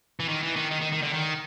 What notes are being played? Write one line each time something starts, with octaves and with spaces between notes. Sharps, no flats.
E3
D#3
E3
D#3
D#3
D#3
D#3
D3
D#3